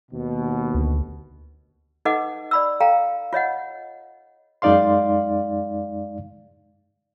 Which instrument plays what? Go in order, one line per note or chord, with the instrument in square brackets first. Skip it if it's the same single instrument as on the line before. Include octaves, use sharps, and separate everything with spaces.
[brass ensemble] D#2 B2
[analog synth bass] D2
[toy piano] D#4 A4 B4 D#5 F#5 D6
D5 B5 E6
A4 F5 G5 A#5
F4 C#5 D#5 F#5
[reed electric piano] F#2 G#3 D#4 D5 F5 C6